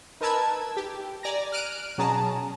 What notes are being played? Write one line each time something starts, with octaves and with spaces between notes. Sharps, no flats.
D#4 A#4 B4 A5 E6 G#6
G4
D5 G#5 A#5 A#6
F6 F#6 D7 D#7
B2 F#3 C#4 G#4 A5 A#5